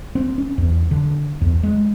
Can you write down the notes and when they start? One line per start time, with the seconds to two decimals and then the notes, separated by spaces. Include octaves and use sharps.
0.15 C4
0.38 C#4
0.58 E2
0.91 D3
1.41 E2
1.63 G#3